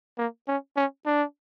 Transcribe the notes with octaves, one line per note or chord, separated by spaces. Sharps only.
A#3
C#4
C#4
D4